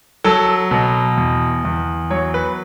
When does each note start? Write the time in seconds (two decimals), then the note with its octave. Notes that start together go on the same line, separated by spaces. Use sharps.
0.24 F#3 A4
0.71 B2
1.17 E2
1.65 E2
2.10 F#3 C#5
2.34 B4